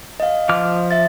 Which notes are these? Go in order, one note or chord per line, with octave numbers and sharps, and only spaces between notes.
D#5 F5
F3 D6 F6
E5 A6